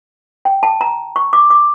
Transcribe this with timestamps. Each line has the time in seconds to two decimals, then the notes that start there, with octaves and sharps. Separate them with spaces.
0.45 G5
0.63 A5
0.81 A#5
1.16 C#6
1.33 D6
1.50 D6